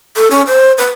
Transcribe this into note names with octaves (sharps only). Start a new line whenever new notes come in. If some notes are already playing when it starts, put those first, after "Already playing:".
A4
C#4
C5
B4